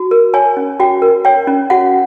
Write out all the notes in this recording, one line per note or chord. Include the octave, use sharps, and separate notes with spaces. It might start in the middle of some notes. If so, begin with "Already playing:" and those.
Already playing: F#4
A#4
C#5 G#5
C#4
F#4 G5
A#4
C#5 G5
C#4
F#4 F#5